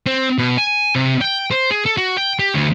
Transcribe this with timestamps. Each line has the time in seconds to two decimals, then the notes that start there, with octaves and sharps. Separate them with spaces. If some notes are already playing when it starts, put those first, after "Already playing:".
0.06 C4
0.38 B2
0.58 G#5
0.95 C3
1.21 G5
1.51 C5
1.71 G#4
1.86 A4
1.97 F#4
2.17 G5
2.39 G4
2.54 D2